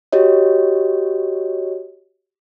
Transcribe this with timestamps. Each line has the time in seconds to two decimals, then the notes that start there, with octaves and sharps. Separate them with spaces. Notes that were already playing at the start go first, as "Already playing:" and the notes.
0.12 F#4 G4 C#5 D#5